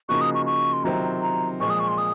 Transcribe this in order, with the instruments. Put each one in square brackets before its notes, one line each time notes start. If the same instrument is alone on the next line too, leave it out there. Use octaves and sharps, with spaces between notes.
[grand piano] C#3 F3 A#3 D#4 F#4 [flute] C#6
[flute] D#6
C#6
C#6
C6
[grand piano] C3 D#3 F#3 C4 F4 [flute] A#5
[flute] A#5
[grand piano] A#2 F3 G#3 [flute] C#6
[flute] D#6
C#6
C6
D#6